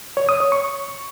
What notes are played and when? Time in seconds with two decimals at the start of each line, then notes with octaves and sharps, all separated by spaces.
0.17 C#5
0.29 D#6
0.40 C#5
0.52 C#6